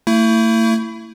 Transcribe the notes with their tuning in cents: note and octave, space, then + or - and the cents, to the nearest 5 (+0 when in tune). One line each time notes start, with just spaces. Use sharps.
A3 +40 E4 +5